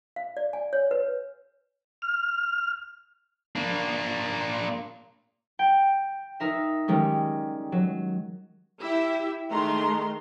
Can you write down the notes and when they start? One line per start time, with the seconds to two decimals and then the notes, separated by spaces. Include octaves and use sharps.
0.16 F5
0.37 D5
0.53 G#5
0.73 C#5
0.91 B4
2.02 F6
3.56 A#3 D4
5.59 G5
6.40 D#4 A#4 E5
6.88 D#3 G3 G#3 C#4
7.72 F#3
8.80 E4 G4 E5
9.51 D#3 G#3 A3 A#5 C6